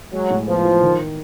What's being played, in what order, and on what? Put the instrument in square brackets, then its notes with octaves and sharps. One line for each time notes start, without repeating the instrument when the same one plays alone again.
[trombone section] F#3 [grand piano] G#3
[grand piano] A2
[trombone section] F3 [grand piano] B3
[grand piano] E3
D#3